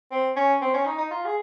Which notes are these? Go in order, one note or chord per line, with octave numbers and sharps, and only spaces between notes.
C4
C#4
C4
C#4
D#4
D#4
F4
G#4